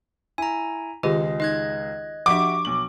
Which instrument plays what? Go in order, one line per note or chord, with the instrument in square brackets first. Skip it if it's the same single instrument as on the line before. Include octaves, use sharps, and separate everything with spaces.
[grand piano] E4 [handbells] G#5 A#5
[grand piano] C#2 G#3 [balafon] D#3 F4 G4 [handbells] D#5
[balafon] D#4 [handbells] D#5 F#6 G#6
[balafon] F3 D4 [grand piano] F#4 G4 E5 [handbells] C#6 [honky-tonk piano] D6
[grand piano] B1 F#7